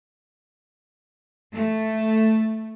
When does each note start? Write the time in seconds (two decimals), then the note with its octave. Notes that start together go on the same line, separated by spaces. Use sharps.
1.53 A3